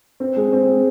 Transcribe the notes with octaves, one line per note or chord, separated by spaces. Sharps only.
C4
G#3
C4
G#3